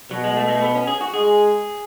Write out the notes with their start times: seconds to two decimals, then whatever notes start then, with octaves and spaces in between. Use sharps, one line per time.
0.11 B2 F#3
0.24 G#3
0.37 A3
0.48 G#3
0.55 A3
0.63 B3
0.75 C#4
0.87 G#4
1.01 F#4
1.14 G#3 G#4